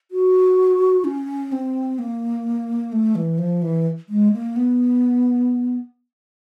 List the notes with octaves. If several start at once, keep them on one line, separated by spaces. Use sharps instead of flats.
F#4
C#4
C4
A#3
A3
E3
F3
E3
G#3
A#3
B3